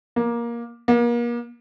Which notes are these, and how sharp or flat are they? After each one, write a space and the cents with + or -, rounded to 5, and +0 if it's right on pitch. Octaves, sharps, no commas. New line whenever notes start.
A#3 +15
A#3 +35